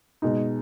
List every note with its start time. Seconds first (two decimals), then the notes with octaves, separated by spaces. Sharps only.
0.22 B2 G#3 D#4